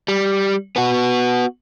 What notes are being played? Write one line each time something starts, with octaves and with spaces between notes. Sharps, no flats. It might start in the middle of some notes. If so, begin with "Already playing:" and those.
G3
B3 F#4